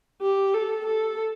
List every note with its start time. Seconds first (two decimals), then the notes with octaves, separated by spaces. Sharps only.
0.22 G4
0.54 A4
0.86 A4